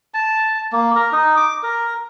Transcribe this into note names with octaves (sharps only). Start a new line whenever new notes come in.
A5
A#3
A#4
D#4
D6
A#4